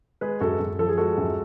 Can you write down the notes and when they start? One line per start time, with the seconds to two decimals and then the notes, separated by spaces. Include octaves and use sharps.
0.21 G#3 G#4 B4
0.40 F#2 F#4 A4
0.60 F#2
0.79 F3 A4
0.89 G#4
0.97 G#3 F#4 A4
1.18 F#2